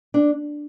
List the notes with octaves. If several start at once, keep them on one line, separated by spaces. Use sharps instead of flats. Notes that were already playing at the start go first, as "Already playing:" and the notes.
D4